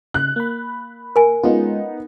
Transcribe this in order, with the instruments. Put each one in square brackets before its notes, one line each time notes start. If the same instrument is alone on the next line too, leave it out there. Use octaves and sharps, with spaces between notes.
[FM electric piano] C#3 [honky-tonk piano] F#6
[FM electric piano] A#3 B5
[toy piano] A#4 G#5
[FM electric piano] G#3 C#4 F4 [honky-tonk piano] B3 D#4